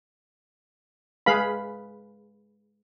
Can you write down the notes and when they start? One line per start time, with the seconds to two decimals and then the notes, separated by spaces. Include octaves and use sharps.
1.26 G#3 G#4 B4 F5 B5